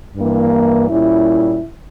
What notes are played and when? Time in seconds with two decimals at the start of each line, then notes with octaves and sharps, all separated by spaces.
0.17 G2 E3 A#3
0.90 A#2 G3 C#4 E4